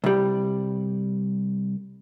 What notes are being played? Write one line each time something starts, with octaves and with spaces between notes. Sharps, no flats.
C2 G3